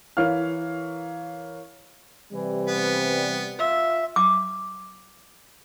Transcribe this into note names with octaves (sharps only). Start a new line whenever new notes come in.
E3 A#4 C#5 F5 F6
C3 E3 G3
B3
F4 E5
D6